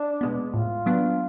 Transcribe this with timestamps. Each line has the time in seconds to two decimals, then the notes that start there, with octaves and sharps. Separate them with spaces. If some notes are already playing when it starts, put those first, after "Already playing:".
Already playing: D4
0.21 B2 G#3 B3
0.53 A2 F4
0.86 F#3 B3 D4